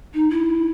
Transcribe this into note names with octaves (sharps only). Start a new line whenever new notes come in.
D#4
E4